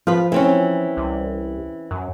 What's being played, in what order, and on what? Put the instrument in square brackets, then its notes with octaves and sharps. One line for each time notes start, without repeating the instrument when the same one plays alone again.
[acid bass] F3 [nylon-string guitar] F4 B4
[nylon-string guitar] E3 C4 C#4
[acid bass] C2
F#2